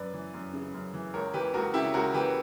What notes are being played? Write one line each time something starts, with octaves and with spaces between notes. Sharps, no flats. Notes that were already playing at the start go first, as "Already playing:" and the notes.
Already playing: F#2 B4 D5
E3
F#2
C#3
F#2
E3
C#2 A#4 C#5
E3 G4 B4
C#2 F#4 A#4
C#3 E4 G4
C#2 F#4 A#4
E3 G4 B4